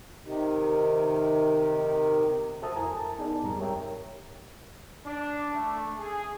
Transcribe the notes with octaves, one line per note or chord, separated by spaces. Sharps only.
C3 D#3
F#4 A4 C5 E5 A5 D#6
F2 E4 A#4 G#5 A#5
A5
B3 D#4 G#4 A#4 D5
F2 G#2 G3 C4 A#5
G4 A#4 C#5 E5 G5
D4
A3
G#4